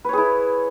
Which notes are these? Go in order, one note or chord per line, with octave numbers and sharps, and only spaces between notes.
E4 G#4 B4 C#5